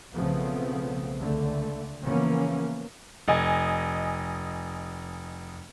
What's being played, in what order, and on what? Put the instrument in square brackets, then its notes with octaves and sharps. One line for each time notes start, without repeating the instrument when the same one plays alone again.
[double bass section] B1 C#3 F3 A3 B3 C4
C#2 D3 A3
C#3 E3 F3 A#3 B3 C#4
[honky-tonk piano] F1 D#5 G#5